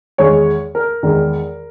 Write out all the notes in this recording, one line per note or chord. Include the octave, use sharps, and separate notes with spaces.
E2 D#3 G#3 C#5
A#4
E2 D#3 G#3